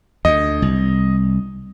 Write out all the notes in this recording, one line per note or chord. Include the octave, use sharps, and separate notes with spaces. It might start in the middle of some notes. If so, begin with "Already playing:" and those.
D2 D#5
C2